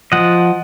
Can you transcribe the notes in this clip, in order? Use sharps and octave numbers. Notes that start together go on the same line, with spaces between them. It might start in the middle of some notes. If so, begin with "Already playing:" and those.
F3 D#5 F#5